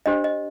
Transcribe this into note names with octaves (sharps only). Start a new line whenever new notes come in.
D4 G4 C5 D#5
D#5